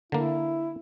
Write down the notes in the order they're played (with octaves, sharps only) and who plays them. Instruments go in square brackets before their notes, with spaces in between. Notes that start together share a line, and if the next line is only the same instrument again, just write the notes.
[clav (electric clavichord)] D3 A#3 [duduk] E4